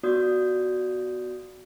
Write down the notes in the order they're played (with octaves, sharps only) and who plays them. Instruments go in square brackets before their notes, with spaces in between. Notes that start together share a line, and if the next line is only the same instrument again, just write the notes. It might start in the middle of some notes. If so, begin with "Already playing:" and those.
[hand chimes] B3 F4 F#4 D5 D#6 G6